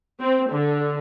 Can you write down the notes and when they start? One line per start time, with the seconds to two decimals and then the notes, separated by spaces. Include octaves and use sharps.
0.21 C4
0.52 D3